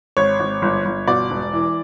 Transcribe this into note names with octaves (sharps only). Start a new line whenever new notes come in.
G#1 C#5
G#1
G1
G1
B2 D5
E1
E3